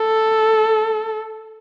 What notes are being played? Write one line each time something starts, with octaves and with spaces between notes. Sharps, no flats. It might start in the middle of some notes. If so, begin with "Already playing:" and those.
Already playing: A4